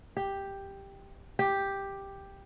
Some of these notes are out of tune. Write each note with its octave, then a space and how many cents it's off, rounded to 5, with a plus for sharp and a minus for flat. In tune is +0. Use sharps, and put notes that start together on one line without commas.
G4 +5
G4 +5